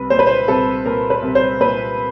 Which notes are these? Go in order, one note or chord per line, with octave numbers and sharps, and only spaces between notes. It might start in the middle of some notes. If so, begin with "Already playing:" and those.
Already playing: C2 B4
A#2 C5
B4
C5
C2 A4
A#2 A#4
B4
C2
C5
A#2 B4